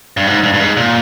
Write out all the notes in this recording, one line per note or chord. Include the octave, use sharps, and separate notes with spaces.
G2
G#2
G2
G2
G#2
A#2